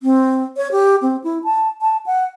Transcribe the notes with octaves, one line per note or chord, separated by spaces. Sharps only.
C4
C#5
G4
C4
E4
A5
A5
F#5